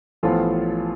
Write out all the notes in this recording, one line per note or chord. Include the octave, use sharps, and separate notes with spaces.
A1 A2 F3 B3 F4 A4